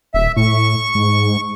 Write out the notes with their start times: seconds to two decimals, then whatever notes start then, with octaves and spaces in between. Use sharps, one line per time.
0.14 D#1 E5
0.37 A2 C#6
0.95 G#2